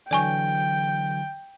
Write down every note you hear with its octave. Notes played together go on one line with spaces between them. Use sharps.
D3 E3 F#3 D5 G5 G#5 C#6